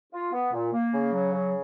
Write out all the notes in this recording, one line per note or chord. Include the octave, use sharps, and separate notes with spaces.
F4
B3
A#2
A#3
C#3
F#3
C#3